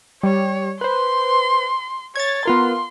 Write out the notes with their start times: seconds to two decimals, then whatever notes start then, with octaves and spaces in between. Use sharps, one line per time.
0.23 G3 C#5
0.81 B4 C5 C6
2.16 C#5 G#6 A6
2.45 B3 F4 A#4 C6